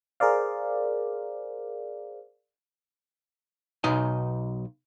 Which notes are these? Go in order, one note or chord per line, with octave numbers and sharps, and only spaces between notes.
G#4 A#4 C5 D5 F5
B1 B2 D#4 D#5 G#5